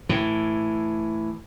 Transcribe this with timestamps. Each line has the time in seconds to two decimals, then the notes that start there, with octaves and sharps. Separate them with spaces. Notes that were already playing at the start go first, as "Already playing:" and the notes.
0.09 A2 E3